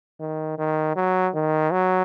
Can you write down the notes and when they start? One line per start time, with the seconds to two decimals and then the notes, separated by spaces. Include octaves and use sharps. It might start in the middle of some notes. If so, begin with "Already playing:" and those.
0.21 D#3
0.58 D#3
0.96 F#3
1.35 D#3
1.72 F#3